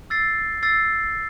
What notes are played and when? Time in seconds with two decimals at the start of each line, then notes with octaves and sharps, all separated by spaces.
0.10 E6 A6 C7
0.63 E6 A6 C7